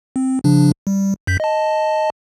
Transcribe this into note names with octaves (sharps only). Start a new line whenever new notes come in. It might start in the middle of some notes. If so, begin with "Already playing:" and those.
C4
C#3 F3 D4
G3
F#2 G6 B6
D#5 A5